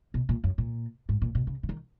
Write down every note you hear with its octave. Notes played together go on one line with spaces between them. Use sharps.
B2
A#2
F#2
A#2
G#2
A#2
B2
C#3
C#3
D#3